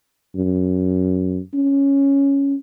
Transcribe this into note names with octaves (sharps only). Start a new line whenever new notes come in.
F#2
C#4